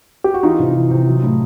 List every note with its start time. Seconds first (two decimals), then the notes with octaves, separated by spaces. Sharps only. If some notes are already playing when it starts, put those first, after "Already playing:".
0.24 G4
0.34 F#4
0.43 E3 D#4 F4
0.60 C3
0.76 E3
0.90 C3
1.07 F#3
1.23 A2